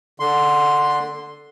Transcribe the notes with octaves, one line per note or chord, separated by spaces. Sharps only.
D3 C6